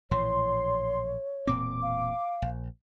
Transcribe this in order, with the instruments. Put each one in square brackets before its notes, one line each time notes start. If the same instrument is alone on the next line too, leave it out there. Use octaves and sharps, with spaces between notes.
[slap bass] A#1 A2 E3 [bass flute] C#5 [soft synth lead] C6
[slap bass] E1 A#2 C4 [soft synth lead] D6
[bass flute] F5
[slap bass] A#1